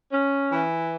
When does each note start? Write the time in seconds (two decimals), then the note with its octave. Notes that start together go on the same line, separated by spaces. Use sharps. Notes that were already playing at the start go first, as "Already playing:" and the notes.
0.12 C#4
0.52 E3